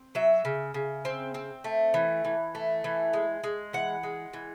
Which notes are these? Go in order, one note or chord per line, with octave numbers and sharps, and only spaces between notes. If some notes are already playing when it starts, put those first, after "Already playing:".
Already playing: C4
F#3 E5
C#3
C#3
C4
C4
A3
E3
E3
A3
E3
G#3
G#3
E3 F#5
G#3
E3